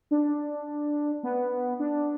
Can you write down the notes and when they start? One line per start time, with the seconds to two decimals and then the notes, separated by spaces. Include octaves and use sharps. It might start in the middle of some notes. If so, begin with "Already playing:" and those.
0.11 D4
1.23 B3
1.80 D4